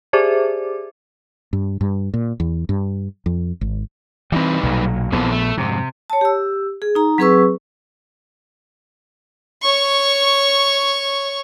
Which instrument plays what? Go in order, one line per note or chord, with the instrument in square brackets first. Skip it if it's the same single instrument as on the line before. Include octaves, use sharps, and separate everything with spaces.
[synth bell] G4 G#4 C5 D5 E5 D6
[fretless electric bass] G2
G2
A#2
E2
G2
F2
G#1
[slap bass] E3 C4 [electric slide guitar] G3 D#4 B4
[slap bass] B1 A#2 F#3
[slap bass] A#1 B3 [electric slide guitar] E3 C4 A4
[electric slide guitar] A3
[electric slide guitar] F2 G#2 [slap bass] C3
[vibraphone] C#5 A5
G4 E6
G#4
D#4 A#5
F#3 C4 G#4 B4 C#6 E6
[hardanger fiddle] C#5 C#6